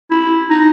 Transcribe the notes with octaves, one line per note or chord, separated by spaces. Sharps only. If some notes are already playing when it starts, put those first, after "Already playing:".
E4
D#4